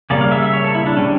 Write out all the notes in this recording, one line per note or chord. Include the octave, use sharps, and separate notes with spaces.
C#3 G3 A#3 C#4 D5
F5
E5
E5
C#5
A4
E4
D4
D3 G3 C#4